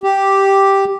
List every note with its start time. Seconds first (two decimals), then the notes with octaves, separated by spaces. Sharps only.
0.04 G4